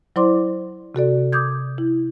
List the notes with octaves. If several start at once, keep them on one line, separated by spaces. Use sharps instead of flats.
F#3 E4 C5 D5 C6 D6
C3 F#4 A4 D5
D6 D#6 G6 G#6
E4